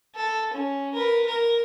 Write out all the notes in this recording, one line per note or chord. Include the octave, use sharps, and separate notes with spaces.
A4
C#4
A#4 B4
A#4